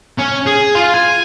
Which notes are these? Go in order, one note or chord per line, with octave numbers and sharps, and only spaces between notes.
C#4
G#4
F4
G#5